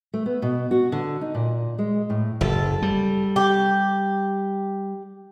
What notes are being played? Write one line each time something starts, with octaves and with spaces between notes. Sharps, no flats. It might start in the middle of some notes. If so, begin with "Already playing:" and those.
A3
B3
B2
F#4
D3
D#4
A#2
G#3
A2
F#1 A4
G3
G4